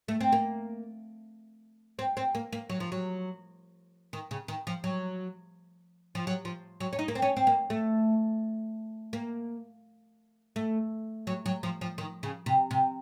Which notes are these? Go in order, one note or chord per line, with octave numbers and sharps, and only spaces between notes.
A3
C4
A#3
C4
C4
A#3
A#3
F#3
F3
F#3
D#3
C#3
D#3
F3
F#3
F3
F#3
F3
F#3
C#4
D#4
A#3
C4
C#4
C4
A#3
A3
A#3
A3
F#3
F#3
F3
F3
D#3
C#3
C3
C3